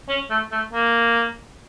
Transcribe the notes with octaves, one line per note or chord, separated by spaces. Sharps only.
C#4
A3
A3
A#3